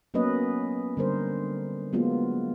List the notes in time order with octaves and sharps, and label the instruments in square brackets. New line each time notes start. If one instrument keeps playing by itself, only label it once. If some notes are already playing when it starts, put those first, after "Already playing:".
[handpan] F#3 A#3 B3 C#4 B4 D#5
D3 G3 A#4 C5
F#3 G#3 A#3 B3 F4